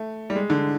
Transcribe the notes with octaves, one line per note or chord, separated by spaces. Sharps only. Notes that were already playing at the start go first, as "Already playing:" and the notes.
Already playing: A3
G3
G#3
D3